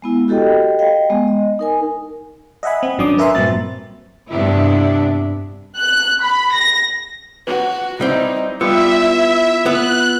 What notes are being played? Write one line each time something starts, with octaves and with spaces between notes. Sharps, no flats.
G#3 B3 E4
F#4 G4 A4 D#5 G5
D#5 F5 G5
G#3 B3
D#5
D#4 A#4 G#5
D#5 E5 F#5 G#5 B5
C4
G#1 F#3 C#4 D4 D6 D#6
A#4 B4 E5 G#5 A#5 C6
G2 A#2 F#3 C4 E5 A6
G2 C3 B3 D4 E4
F#6
B5
A#6
F#4 B4
G3 C4 D#4 E4
G3 B3 F4 E5 E6 C#7
E4
B3 F#6